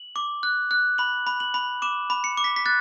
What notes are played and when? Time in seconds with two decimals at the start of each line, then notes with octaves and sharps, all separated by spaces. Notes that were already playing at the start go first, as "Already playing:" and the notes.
Already playing: F#7
0.16 D6
0.43 F#6
0.71 F#6
0.98 B5 F#7
1.27 B5
1.40 F#7
1.54 B5
1.82 D6 E7
2.10 B5
2.24 C#7
2.37 D6
2.44 B6
2.56 B6
2.66 F#6 A6